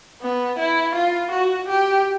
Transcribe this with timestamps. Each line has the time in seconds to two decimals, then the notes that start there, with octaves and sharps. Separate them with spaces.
0.22 B3
0.59 E4
0.95 F4
1.32 F#4
1.69 G4